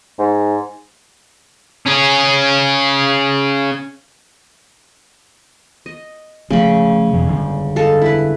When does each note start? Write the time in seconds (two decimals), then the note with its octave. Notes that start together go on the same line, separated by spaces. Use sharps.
0.19 G#2
1.86 C#4 G#4
5.86 D#5
6.50 C#3 F3 A3 C#4 B5
7.13 E2 B2
7.29 D3 G3 G#3
7.76 A4 D#5 F5
8.02 E4 B4